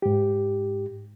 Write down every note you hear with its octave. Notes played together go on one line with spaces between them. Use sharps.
G#2 G4